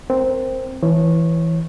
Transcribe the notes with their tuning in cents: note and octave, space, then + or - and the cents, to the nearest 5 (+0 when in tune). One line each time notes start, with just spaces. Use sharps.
C4 +0 A#4 +0
E3 +0 C#5 -20